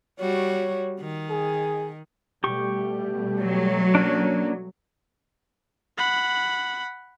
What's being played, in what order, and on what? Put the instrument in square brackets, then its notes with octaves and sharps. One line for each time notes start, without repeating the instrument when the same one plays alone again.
[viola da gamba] G3 F#4 [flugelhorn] C#5
[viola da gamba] D#3
[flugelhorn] G#4
[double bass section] B2 G3 A3 [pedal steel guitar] G4 C#6
[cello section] F#3
[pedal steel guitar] A#3 C#4 D4
[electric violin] F#5 B5